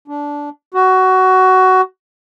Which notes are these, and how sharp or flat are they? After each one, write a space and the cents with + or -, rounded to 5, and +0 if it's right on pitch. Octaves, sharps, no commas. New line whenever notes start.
D4 -15
F#4 +15